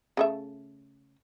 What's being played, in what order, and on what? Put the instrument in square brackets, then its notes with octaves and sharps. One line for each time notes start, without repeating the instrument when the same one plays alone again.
[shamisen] C#3 A3 E5